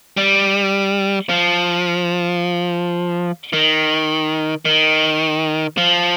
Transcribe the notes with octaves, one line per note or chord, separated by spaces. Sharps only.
G3
F3
D#3
D#3
F3